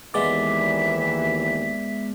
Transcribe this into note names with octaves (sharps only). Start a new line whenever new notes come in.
D#2 E3 G#3 B3 D5 E5